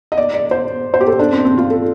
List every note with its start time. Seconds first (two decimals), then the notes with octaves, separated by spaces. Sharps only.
0.12 D#5
0.18 D5
0.34 D5
0.51 C5
0.94 C5
1.01 G4
1.07 A4
1.19 D4
1.33 C4
1.45 C4
1.58 F4
1.70 A4